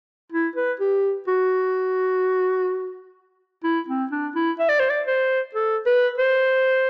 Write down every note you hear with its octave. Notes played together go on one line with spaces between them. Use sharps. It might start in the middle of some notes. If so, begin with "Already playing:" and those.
E4
B4
G4
F#4
E4
C4
D4
E4
E5
D5
C5
D5
C5
A4
B4
C5